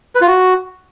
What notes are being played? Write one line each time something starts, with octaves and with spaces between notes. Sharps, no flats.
B4
F4
F#4